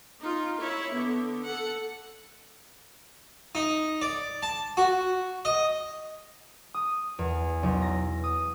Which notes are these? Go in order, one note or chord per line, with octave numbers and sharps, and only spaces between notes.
D#4 F4
E4 C#5
D3 B3
A4 F#5
D#4
D5
A5
F#4
D#5
D#6
E2
B1
A#6
D#6